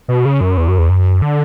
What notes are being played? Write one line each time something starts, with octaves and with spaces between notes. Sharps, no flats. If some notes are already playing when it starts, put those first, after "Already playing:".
B2
C#3
F#2
E2
F#2
E2
F#2
D3